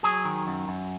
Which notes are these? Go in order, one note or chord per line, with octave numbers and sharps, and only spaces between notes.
F#3 G#4
D#3
F#2
F#2